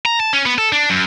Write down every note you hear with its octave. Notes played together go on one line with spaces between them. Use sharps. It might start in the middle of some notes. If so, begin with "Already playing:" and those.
A#5
A5
C#4
B3
A4
D4
F#2